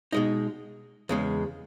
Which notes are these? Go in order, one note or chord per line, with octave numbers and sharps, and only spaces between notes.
B2 G#3 D#4
E2 C#3 G#3